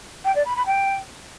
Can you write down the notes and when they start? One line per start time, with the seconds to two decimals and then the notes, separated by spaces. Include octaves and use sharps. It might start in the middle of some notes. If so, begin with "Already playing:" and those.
0.25 G5
0.35 D5
0.45 B5
0.56 B5
0.66 G5